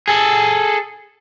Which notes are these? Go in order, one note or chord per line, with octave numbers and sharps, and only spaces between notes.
G#4 A4